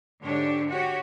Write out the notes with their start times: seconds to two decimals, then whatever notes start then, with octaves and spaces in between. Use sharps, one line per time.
0.24 G#2 D3 D4 G4 C#5
0.69 F#4 G4 C#5